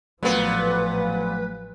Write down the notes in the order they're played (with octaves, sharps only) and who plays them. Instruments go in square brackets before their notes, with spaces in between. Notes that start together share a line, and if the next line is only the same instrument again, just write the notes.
[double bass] A1 F3 [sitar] A#2 B3 [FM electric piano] F#3 A3 [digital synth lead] B4